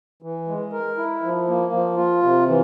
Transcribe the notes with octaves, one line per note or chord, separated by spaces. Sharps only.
E3
G#3
A#4
E4
F3
A#3
F3
F4
C3
E3